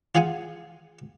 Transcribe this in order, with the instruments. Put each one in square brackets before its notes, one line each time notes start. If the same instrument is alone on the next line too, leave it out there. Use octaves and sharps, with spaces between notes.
[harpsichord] F4 G#4 F5 F#5 G#5